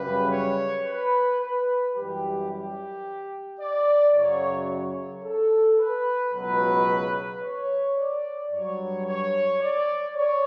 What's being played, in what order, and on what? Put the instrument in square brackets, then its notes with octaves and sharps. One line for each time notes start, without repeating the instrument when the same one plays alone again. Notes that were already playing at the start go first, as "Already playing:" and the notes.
Already playing: [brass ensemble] F#2 C#3 G3 B4
C#5
B4
B4
F#2 E3 G3 G4
G4
D5
F#2 C#3 F#3 C#5
C#5
A4
B4
C#2 B2 F#3 B4
C#5
D5
G2 F#3 C#5
C#5
D5
C#5